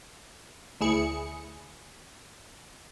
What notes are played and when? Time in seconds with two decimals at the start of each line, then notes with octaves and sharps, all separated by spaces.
0.81 D2 E4 G#4 C#7